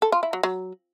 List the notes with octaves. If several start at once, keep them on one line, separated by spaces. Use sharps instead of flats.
A4
F4
E4
F#3
F#3